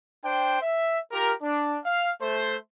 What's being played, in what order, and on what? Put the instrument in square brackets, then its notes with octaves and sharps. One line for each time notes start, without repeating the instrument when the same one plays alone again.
[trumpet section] D4 C5 G5
E5
F4 G4 A#4
D4
F5
A3 C5